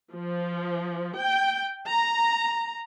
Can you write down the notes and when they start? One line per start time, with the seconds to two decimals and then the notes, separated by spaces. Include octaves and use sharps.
0.13 F3
1.17 G5
1.88 A#5